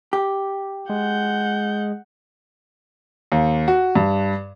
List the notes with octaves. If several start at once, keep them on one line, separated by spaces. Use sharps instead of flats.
G4
G#3 F#5 G6
D#2
F#4
G2